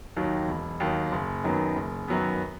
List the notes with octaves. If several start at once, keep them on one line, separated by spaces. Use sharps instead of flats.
D#2 D#3 F#3
E1
D#2 D#3 F#3
F#1
F#2 D#3 F#3 B3
F#1
F#2 D#3 F#3 B3